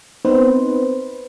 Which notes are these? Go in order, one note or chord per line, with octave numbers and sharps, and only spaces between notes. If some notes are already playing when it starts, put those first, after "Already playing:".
B3 C4 D#4 B4 C5